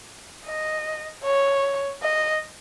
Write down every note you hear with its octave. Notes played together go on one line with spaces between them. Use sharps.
D#5
C#5
D#5